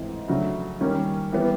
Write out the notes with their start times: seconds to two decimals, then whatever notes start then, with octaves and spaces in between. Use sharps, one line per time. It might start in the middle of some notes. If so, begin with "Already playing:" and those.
Already playing: G#2 E3 A3 C4
0.28 C#3 F#3 A3 D4
0.81 D#3 G3 A#3 C#4
1.32 E3 G3 B3